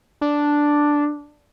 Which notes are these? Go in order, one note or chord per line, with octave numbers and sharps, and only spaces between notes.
D4